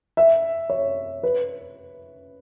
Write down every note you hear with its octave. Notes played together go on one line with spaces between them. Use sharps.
E5
C#5
B4